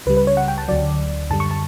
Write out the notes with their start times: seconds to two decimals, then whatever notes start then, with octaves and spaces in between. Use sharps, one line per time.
0.06 C#2 C#3 G3 B4
0.17 B4
0.27 C#5
0.37 F#5
0.48 G5
0.58 A5
0.68 D2 D3 F#3 D5
1.30 F#2 D3 G3 A5
1.40 C#6
1.51 A5